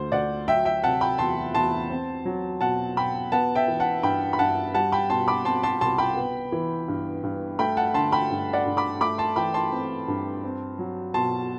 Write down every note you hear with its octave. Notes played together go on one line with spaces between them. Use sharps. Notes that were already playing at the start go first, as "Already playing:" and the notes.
Already playing: D2 A3 C5
D2 D5 F#5
F#3 E5 G5
E5 G5
C3 F#5 A5
G5 B5
E2 A5 C6
E2 A5 C6
C4
F#3
B2 F#5 A5
B2 G5 B5
B3 F#5 A5
E5 G5
E3
F#5 A5
G2 G5 B5
B5
G2 F#5 A5
G3 F#5 A5
G5 B5
B2 A5 C6
B5 D6
C4 A5 C6
A5 C6
C2 A5 C6
G5 B5
B3
E3
G2
G2
A3 G5 B5
F#5 A5
D3 A5 C6
G5 B5
G2
D5 F#5
G2
B5 D6
A3 B5 D6
A5 C6
E3 G5 B5
A5 C6
C4
G2
C4
F#3
B2 A5 C6